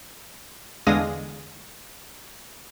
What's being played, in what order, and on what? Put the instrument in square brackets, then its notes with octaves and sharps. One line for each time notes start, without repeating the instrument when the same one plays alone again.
[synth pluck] E2 D3 G#3 F5 D#6 A#6